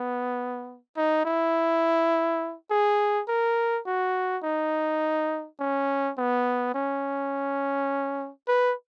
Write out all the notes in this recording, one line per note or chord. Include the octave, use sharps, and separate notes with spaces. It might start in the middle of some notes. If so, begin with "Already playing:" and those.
Already playing: B3
D#4
E4
G#4
A#4
F#4
D#4
C#4
B3
C#4
B4